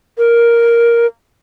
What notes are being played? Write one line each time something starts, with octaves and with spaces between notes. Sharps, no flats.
A#4